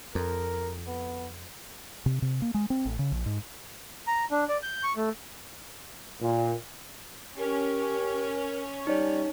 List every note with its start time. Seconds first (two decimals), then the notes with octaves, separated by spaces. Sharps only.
0.15 F2 A#4
0.87 B3
2.06 C3
2.22 C3
2.42 A#3
2.54 G#3
2.70 C4
2.85 A1
2.99 C#3
3.12 A#1
3.26 G#2
4.07 A#5
4.31 D4
4.49 D5
4.63 G6
4.83 C#6
4.97 A3
6.20 A#2
7.38 C#4 G4 A#4
8.87 G3 D#4 C#5 D5